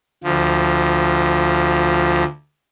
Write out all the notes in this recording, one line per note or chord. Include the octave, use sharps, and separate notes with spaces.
D2 F3